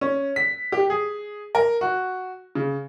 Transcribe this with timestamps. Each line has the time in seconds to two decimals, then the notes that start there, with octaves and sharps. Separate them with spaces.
0.01 C#4
0.36 B6
0.72 G4
0.90 G#4
1.55 A#4
1.81 F#4
2.55 C#3